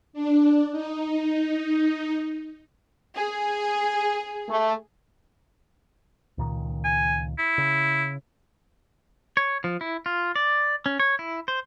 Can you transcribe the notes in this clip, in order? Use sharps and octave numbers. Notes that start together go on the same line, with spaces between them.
D4
D#4
G#4
A3
C#2 A#2 D#3
G#5
E4
C#3
C#5
F3
E4
F4
D5
C#4
C#5
E4
C5